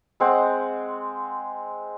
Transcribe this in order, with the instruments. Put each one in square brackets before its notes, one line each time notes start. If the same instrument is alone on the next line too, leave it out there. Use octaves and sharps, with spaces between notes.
[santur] G#3 C4 C5 F#5